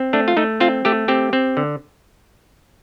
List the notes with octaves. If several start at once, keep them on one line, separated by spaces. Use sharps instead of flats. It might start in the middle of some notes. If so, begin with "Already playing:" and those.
Already playing: C4
A3 D4
F4
A3 D#4
C4 F4
A3 G4
C4 G4
C4
D3